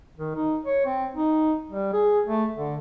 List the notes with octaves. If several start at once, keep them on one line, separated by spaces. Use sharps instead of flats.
D#3
D#4
C#5
C4
D#4
G3
G#4
A3
D3